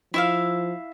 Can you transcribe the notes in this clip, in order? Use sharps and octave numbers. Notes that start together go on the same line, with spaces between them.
F3 E4 E5 F5